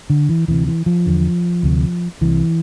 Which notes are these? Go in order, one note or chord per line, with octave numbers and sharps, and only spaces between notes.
D3
E3
D2 C3 E3
E3
F3
E2 D3
D2 C3
C2 C3 E3